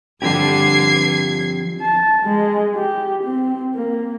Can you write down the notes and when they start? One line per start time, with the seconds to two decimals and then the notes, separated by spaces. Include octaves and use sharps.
0.22 G2 D3 F3 G3 C4 G4 G#6 C7
1.81 A5
2.23 G#3
2.76 G4
3.24 C4
3.75 A#3